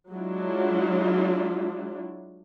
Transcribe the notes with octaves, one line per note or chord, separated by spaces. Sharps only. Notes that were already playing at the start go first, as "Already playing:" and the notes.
F#3 G#3 D4 E4 F4